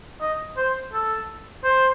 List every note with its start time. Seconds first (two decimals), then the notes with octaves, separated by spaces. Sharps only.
0.21 D#5
0.57 C5
0.94 A4
1.64 C5